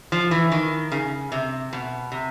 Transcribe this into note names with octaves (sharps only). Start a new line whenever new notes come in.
F3
E3
D#3
C#3
C3
B2
C3